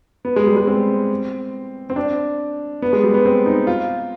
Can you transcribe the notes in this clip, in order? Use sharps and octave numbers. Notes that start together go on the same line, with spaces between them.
B3
G#3
G3
G#3
C4
C4
D4
B3
G#3
G3
B3
C4
D#4
F4